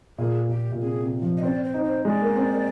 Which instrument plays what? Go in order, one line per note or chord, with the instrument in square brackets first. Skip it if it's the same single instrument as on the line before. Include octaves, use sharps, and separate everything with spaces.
[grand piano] A#2 [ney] G#4
[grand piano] A#2 [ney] G4
[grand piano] A#2
[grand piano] C3 [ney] G#4
[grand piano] C3
F3
[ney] D#5
[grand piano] C4 [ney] D5
[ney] C5
[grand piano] D#4
[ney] C5
[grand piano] G#3 [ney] D5
[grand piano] A#3
C4
A#3